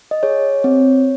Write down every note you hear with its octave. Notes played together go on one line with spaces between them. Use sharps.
D#5
G#4 C#5
C4